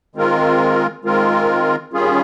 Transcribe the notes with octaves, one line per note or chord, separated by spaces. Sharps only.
D#3 G#3 C4 F4 A#4
D#3 G#3 C4 F4 A#4
D#3 G3 C#4 F4 G#4